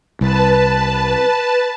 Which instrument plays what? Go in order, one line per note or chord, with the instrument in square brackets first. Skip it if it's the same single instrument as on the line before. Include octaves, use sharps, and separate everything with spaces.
[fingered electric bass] C2 [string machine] B4 A5